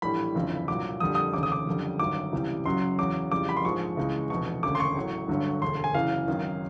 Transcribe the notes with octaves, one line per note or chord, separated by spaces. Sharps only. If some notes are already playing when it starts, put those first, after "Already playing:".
A#1 A2 E3 G3 B5
G1 F2 C#3 E3
C2 A#2 F#3 D6
F2 D3 G3 D#6
D#6
F1 D#2 C#3 D6
D#6
D6
F#1 F2 D3 G3
G1 G2 D#3 F#3 D6
C#2 C3 E3 G3
F#1 F#2 C#3 F#3 C6
E2 C#3 F#3 D6
F2 C#3 E3 G3 D6
B5
C6
A#1 G#2 F3 G#3 C#6
C#2 C#3 E3 G#3
F1 E2 B2 C#6
E1 D2 C#3 D6
C6
C#6
A1 A2 F#3
G1 G2 D3 F#3
E1 D2 D3 C6
G#5
F#1 F#2 C#3 E3 F5
G#1 F#2 D#3